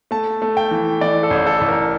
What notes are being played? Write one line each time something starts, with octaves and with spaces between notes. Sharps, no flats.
A3 A5
A3
G5
E3
E3 D5
A4
A1
A4
A1
A#4